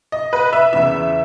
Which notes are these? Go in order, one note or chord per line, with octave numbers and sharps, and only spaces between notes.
D#5
B4
E5
E2 C#3 E3 E5